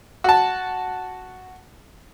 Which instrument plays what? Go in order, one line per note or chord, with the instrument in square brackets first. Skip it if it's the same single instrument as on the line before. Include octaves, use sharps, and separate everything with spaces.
[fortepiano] F#4 A5